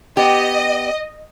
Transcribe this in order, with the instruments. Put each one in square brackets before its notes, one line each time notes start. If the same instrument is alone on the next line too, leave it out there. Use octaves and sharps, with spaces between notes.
[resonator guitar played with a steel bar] B3 G4 [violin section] D#5